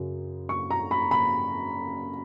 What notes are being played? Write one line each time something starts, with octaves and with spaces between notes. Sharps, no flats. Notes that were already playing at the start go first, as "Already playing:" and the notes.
Already playing: F#2 C#3 F#3
C#6
A#5
B5
B5